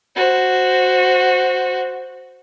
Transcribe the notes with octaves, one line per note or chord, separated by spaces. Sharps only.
F#4 C5